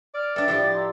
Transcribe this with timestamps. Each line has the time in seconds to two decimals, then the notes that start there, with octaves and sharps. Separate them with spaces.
0.14 D5 F6
0.36 D4 A4 B4 E5 G5 A6
0.48 A2 F3 G4
0.74 A#5 C6 E6